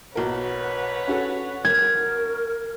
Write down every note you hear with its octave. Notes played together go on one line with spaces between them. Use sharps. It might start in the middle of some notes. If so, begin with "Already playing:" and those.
B1 A#4 B4 C#5 F#5
C#4 F#4 A4
A#4 G#6